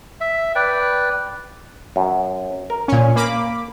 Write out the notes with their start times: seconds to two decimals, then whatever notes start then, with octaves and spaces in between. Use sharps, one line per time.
0.21 E5
0.55 B4 D5 G5
1.96 F#2
2.70 A#4
2.88 A#2 C#4
3.16 A#3 B5 D6